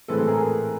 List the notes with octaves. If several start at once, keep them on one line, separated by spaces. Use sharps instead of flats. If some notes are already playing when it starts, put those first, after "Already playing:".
A2 E3 G#3 C4 A4 B4
G#4 A#4